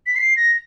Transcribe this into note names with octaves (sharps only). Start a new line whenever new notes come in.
B6
C7
A#6